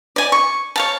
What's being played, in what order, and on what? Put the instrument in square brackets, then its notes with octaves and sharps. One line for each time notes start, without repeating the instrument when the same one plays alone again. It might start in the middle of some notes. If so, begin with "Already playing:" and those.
[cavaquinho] D5 G#5
C#6
C#5 F5 A5